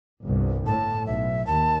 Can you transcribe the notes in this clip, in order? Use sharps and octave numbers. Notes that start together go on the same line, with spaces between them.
G1 C2
A2 A5
B1 E5
D#2 A5